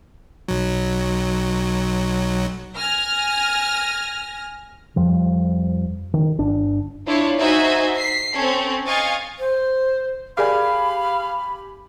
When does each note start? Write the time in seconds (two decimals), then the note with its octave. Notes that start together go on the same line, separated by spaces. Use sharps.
0.48 B1 F#3
2.76 G#5 F6 A#6
4.96 F2 F3 G3
6.14 D#3
6.38 G1 D4
7.07 D4 E4 F4 C#5
7.39 D#4 F#4 C5 E5 G#5
7.95 B6 C7
8.34 C4 C#4 A4 C#5
8.86 D#5 F5 G#5 C#6 A6
9.39 C5
10.37 G4 G#4 A#4 D5 F5 G#5 B5